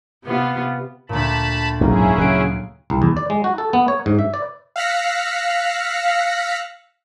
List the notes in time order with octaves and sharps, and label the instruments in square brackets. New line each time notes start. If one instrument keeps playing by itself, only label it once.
[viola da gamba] C3 B3 F4
[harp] D2 A#2 [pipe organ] A5 B5
[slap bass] B1 G#2 [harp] F#3 A#3 [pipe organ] C#4 E4 G#4
[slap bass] C#3 F#3 [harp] F#6 C7 D7
[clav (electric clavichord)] C2
E2
D5
G#3
F#4
A4
B3
C#5
G#2
E5
D5
[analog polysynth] F5 E6 F#6 A#6 B6 C#7